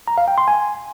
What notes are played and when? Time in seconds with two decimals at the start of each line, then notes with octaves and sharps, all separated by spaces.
0.08 A#5
0.18 F5
0.28 G5
0.38 C6
0.48 G#5